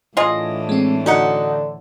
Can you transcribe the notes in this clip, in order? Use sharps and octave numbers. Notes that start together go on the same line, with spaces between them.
A2 E3 D4 F4 G#4 D#5
G#3 C4
D3 C#4 D#4 F#4 F#5